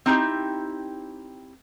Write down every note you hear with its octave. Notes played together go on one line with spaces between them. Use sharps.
C4 D#4 E4 G4